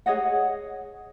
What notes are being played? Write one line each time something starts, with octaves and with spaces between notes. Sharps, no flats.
G#4 C#5 D#5 F#5